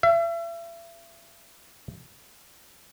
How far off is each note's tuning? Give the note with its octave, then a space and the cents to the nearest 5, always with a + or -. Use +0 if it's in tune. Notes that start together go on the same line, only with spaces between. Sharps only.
E5 +40